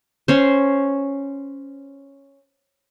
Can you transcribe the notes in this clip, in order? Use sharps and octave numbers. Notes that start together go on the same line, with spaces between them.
C#4 C5